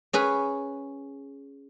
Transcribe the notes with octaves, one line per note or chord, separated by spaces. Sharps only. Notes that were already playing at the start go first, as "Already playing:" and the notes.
C#4 G#4 B4